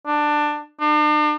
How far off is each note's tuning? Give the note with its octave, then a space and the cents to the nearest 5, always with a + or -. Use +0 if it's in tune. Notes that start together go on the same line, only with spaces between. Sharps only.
D4 +15
D4 +40